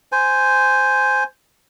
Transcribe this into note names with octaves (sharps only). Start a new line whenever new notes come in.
C5 G#5